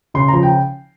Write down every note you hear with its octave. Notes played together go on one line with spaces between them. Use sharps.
C#3 C6
F3 A#5
G5